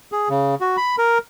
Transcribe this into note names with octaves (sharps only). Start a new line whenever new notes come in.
G#4
C#3
F#4
B5
A#4